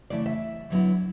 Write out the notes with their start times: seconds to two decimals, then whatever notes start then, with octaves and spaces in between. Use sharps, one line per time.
0.10 C#3 E3 A3 E4 D5
0.26 E5
0.70 D3 F#3 B3 E4